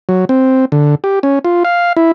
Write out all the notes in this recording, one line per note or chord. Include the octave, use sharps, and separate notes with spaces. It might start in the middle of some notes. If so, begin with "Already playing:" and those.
F#3
C4
D3
G4
C#4
F4
F5
E4